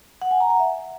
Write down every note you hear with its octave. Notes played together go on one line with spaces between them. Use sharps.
F#5
G#5
A#5
F#5
E5